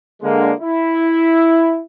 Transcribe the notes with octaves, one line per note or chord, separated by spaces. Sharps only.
D3 G#3 A#3
E4